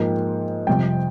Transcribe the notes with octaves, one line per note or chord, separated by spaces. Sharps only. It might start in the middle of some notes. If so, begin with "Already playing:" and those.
Already playing: G#2 F3 A#3 G5
F2 C3 G3 G5